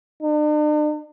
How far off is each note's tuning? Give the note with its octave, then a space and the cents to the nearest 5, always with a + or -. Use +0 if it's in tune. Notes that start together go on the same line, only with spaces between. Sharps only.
D4 +45